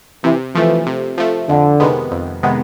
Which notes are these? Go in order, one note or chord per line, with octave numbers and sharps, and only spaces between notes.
C3 E3
E3 F3 A3
C3
F3 A3
F2 D3
C3 D#3 G#3 B3
F2
C3 D#3 G#3 B3